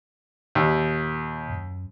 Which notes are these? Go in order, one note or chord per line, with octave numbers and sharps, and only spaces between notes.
D#2 A#2
F#2